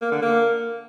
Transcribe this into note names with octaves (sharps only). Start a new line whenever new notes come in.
A#3
D3
A#3